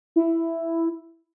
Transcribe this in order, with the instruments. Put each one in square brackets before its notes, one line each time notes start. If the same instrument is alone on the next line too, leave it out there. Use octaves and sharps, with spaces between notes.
[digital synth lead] E4